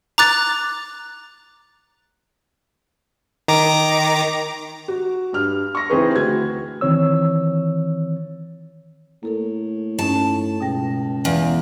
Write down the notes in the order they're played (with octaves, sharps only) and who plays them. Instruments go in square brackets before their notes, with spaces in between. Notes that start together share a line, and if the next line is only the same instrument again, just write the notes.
[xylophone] A#5 D6 F#6 A6
[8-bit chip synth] D#3 A#5 D6
[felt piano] F#4
G2 F6
C#6 A#6
E3 C4 D#4 G#4 B4 C5
D2 F#4 G#6
[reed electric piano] D#3 E3 C4 C#5 E6
[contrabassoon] A2 [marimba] A#3 A4 A#4
[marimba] G2 C#4 D#4 [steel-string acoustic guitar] A5
[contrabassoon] C#2 [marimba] B2 G5 A#6
[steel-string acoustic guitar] E2 [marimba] F5 G#5